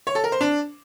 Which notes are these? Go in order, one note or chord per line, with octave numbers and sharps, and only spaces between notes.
C#5
A4
A#4
C5
D4